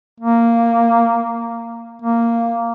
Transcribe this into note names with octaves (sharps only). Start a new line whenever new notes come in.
A#3
A#3